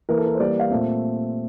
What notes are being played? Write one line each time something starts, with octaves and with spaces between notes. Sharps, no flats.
E3 A#3 A#4
A4
A#4
C5
E3 G3 A#3 D5
F5
A#2 A3 C4 E5